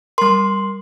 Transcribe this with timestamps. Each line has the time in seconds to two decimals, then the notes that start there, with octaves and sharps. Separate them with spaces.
0.18 G3 A#4 C6